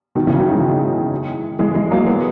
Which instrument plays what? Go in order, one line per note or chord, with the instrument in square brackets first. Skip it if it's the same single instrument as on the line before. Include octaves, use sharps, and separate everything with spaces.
[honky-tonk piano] B2 D#3
C#3 E3
D#3 F#3
E3 G#3
E3 G#3
E3 G#3
F#3 A#3
G#3 B3